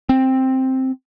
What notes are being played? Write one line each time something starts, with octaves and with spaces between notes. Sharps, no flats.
C4